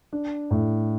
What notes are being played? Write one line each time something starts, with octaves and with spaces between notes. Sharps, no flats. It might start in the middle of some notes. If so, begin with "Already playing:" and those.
D4
A2